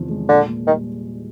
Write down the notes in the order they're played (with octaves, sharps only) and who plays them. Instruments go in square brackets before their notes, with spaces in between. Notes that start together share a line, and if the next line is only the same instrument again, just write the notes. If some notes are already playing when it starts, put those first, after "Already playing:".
Already playing: [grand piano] E2 C3 D#3 F3
G#3
[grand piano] A#2 [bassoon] D3
[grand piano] A#3
[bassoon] D#3 [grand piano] G3